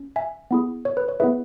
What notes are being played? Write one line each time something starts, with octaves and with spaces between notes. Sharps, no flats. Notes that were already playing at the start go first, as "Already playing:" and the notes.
Already playing: C#4
E5 G#5
B3 E4 G#4
C#5
B4
C#5
B3 E4 G#4 B4 E5